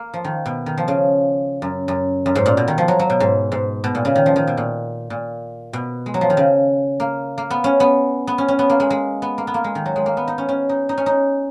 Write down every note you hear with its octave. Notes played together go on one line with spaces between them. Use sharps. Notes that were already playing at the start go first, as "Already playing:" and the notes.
Already playing: A#3
F3
D#3
B2
D#3
F3
C#3
F#2
F#2
F#2
G#2
A#2
B2
D#3
F3
F#3
F#3
B2
G#2
G#2
B2
A#2
C#3
D#3
F3
D#3
B2
A#2
A#2
B2
G#3
F#3
F3
D#3
C#3
A#3
A#3
B3
C#4
B3
B3
C#4
C#4
B3
A#3
G#3
G#3
B3
A#3
B3
A#3
G#3
D#3
F#3
G#3
A#3
B3
D#4
C#4
C#4
D#4
D#4
C#4
D#4